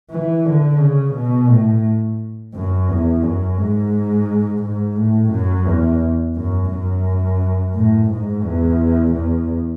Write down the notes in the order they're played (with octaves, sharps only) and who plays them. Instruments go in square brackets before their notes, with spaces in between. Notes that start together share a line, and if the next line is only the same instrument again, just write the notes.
[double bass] E3
D3
C#3
B2
A2
F#2
E2
F#2
G#2
G#2
A2
F#2
E2
F#2
F#2
A2
G#2
E2
E2